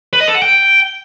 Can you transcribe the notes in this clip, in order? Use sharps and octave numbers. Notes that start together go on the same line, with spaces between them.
B4
D#5
A4
F#5
G5